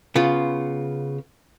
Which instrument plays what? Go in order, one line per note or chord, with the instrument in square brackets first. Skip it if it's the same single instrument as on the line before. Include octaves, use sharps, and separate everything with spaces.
[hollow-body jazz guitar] C#3 B3 F4